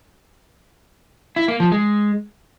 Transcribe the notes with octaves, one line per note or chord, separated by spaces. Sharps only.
E4
A#3
F3
G#3